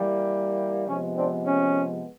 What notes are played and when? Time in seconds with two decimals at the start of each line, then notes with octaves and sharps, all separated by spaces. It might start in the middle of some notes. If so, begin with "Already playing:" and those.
Already playing: E3 G3 A#3
0.87 C3 F3 G#3 B3 C#4
1.17 C4 D4
1.45 C#4